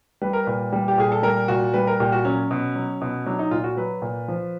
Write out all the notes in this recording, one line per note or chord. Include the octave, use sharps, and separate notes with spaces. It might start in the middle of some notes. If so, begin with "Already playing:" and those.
G3 B4
A#4
A#2 B4
G3
G4
A#2 G#4
A4
G3 A#4
A#2 F#4
G3 B4
A#4
A#2 G4
F#4
F#3 C#4
B2
F#3
B2
F#3 D4
D#4
A#2 F4
F#4
F#3 B4
A#2
F3